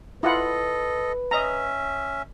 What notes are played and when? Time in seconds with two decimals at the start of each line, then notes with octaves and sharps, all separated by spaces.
0.23 E4 F4 A4 B4 D#5 F#5
1.31 C#4 D#5 E5 A#5